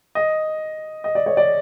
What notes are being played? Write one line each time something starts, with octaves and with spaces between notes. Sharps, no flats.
D#5
D#5
D5
C#5
D5